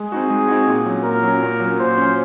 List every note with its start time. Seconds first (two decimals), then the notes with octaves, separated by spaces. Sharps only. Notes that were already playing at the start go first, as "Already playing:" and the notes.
Already playing: G#3 G#4
0.12 C4 D#4 F#4
0.30 G#3
0.48 C4 D#4 F#4
0.67 A#2
0.86 F#3 C#4
1.04 A#2 A#4
1.23 F#3 C#4
1.43 A#2
1.60 F#3
1.65 C#4
1.79 A#2 C5
1.98 F#3 C#4